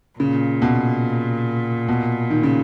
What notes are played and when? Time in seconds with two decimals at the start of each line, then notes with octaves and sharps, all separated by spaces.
0.19 A#2 C#3
0.62 B2
1.88 B2
2.30 D#3
2.43 C#3